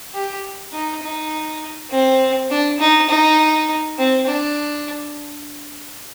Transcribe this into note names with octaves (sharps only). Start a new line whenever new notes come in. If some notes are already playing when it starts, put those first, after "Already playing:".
G4
D#4
D#4
C4
D4
D#4
D#4
C4
D4